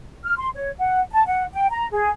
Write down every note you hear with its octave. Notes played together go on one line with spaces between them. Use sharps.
F6
C6
C#5
F#5
A5
F#5
G5
A#5
G#4